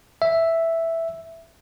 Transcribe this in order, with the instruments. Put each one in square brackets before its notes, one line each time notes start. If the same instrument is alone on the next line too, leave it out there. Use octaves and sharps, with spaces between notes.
[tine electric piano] E5